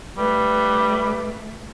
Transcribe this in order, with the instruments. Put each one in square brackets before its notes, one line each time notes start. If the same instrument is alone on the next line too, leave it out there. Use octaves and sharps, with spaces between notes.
[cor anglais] G3 [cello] A3 [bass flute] B4